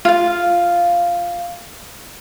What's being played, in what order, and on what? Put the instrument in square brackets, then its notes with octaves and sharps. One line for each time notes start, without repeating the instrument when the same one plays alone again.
[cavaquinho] F4 F5